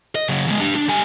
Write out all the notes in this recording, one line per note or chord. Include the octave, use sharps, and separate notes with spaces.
D#5
C#3 F#3
E2 G#3
D4 G4
D4
G3 G#5